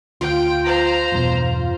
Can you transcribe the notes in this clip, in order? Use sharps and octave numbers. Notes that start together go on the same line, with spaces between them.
D2 F4 G5
C5 A#5
E2 G2 B2